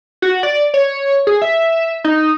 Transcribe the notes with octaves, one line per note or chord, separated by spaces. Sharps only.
F#4
D5
C#5
G#4
E5
D#4